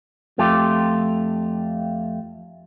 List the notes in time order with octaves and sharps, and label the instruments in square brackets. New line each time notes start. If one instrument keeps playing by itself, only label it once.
[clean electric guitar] F2 A3 F4 G4